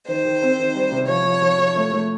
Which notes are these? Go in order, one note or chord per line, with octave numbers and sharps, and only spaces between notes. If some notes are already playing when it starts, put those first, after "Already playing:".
D#3 C5
D#3
C4
D#3
G3
C3
F3 C#5
F3
F3
F3
A3
A3